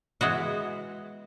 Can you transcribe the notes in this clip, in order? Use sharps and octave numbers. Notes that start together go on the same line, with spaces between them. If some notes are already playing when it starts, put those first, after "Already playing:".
E3 G#3 B3 F#4